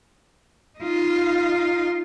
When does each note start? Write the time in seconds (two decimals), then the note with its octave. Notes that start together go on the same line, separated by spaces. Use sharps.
0.79 D#4 F4